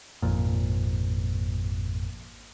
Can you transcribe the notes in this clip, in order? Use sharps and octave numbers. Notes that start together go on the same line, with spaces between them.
G#1 F2 A#2